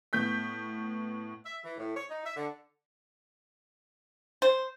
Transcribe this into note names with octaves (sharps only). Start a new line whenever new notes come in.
A2 B3 G6 B6
E5
E3
A2
C#5
D#4
E5
D3
C5